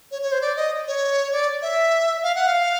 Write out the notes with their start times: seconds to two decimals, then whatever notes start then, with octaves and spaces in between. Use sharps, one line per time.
0.11 C#5
0.22 C#5
0.32 C5
0.41 D5
0.56 D#5
0.87 C#5
1.33 D5
1.62 E5
2.23 F5
2.35 F#5
2.47 F5